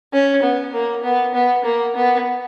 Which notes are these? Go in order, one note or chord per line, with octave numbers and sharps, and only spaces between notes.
C#4
B3
A#3
B3
B3
A#3
B3